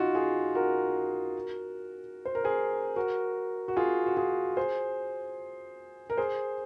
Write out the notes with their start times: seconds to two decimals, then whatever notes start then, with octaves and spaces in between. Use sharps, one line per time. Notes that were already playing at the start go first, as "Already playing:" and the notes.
Already playing: D#4 F4 F#4
0.15 F4 G#4
0.55 F#4 A#4
2.25 C5
2.35 A#4
2.44 G#4 C5
2.96 F#4 A#4
3.68 F#4
3.76 F4 G#4
4.06 F#4
4.17 F4 G#4
4.57 G#4 C5
6.10 A#4
6.17 G#4 C5